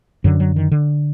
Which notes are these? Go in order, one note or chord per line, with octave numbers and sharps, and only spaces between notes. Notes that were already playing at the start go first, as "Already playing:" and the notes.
F#2 D3 F#3
F#3
D#3
D3